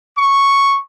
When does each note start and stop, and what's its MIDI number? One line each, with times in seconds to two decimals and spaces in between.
0.15 0.76 85